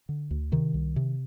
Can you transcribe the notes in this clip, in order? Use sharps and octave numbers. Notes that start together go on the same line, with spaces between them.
D3
D2
C3 D#3
C2
C3